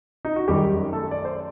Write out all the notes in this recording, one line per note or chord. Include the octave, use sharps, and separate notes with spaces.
D#4
F#4
F#2 D#3 G3 G4
A3 A4
D5
C5